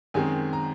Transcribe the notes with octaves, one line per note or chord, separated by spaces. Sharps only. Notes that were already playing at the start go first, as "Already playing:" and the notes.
F#2 D#3 G#3 C4 G#5
A#5